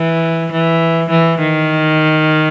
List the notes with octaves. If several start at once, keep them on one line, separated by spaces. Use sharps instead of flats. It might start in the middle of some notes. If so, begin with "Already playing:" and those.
Already playing: E3
E3
E3
D#3